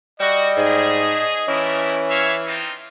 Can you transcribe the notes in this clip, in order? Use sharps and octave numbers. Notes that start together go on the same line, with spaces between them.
G3 F#4 D#5
G#2 A3 G#4
E3 A3 C#4 E4 A#4
C#5 E5 F5
C4 D#4 F4